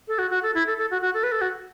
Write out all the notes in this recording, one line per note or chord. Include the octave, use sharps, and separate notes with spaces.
A4
F#4
F#4
A4
E4
A4
A4
F#4
F#4
A4
B4
A4
F#4